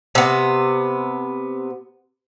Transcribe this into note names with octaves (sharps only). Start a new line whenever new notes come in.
C3 B3